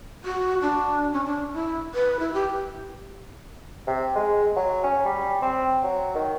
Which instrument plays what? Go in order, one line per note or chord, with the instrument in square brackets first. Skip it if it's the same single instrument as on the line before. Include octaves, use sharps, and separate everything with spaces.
[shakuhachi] F#4
D4
C#4
D4
E4
B4
E4
G4
[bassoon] C3
G#3
F#3
C#4
G3
C4
F#3
D#3